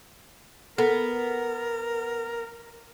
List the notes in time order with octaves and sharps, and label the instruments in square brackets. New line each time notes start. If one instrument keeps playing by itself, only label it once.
[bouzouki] B3 [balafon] A4 [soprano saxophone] A#4